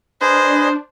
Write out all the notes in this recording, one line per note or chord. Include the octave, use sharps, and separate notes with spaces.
D4 G#4 B4 C5 D#5